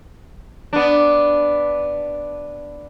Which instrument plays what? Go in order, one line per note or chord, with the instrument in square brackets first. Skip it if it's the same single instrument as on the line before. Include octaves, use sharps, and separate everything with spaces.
[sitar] B3 D4